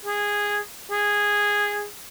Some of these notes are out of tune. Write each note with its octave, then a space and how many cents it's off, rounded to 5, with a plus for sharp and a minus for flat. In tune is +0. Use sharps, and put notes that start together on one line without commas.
G#4 -10
G#4 -10